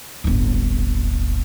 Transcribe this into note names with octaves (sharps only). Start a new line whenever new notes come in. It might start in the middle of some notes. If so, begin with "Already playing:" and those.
D1 G1